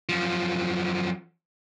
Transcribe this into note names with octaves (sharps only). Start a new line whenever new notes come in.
F#2 F3